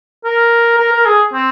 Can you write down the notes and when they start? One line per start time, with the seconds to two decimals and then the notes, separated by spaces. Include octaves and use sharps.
0.25 A#4
0.78 A#4
0.92 A#4
1.06 G#4
1.34 C4